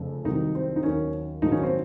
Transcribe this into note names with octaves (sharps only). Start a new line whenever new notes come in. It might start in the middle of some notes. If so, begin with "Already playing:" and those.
Already playing: F1 F2 C#3
C2 C3 D#3 F#3 D#4
C4
D#4
D#2 D#3 F#3 C#4
A#1 G#2 D#3 F#3 D#4
C#4
C4